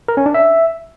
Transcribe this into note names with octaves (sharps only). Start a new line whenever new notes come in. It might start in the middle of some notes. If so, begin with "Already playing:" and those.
A#4
C#4
D4
E5